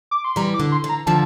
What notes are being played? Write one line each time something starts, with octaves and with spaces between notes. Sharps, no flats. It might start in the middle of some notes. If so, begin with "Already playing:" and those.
D6
C6
E3 G3 A#5
D6
D3
C6
D3
A#5
D3 F3 A5